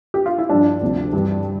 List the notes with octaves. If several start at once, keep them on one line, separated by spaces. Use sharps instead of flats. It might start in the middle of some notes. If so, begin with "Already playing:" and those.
G4
F4
E4
G2 F3 D4
D2 C3 F3
G2 E3 G3